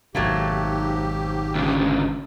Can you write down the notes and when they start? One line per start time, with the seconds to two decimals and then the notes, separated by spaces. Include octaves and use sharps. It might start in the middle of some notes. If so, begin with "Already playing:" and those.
0.15 G#1 G#2 B2 F#3 A3 A#3 G4
1.55 D2 C#3